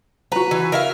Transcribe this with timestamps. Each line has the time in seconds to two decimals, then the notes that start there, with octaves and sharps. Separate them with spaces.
0.32 F#4 B4 A#5
0.51 E3
0.72 A#4 E5 F5